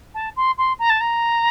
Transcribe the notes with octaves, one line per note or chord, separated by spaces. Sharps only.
A5
C6
C6
A#5
A5
A#5